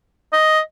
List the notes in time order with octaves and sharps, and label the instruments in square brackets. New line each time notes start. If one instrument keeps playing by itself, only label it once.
[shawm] D#5